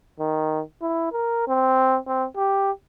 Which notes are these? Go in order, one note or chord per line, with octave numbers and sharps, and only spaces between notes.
D#3
E4
A#4
C4
C4
G4